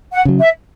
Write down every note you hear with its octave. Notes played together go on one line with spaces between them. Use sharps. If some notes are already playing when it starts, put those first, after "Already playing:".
F#5
C#3 F#3
E5